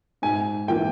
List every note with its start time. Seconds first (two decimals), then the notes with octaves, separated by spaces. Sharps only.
0.22 G#2 G#5
0.68 E3 A#3 G5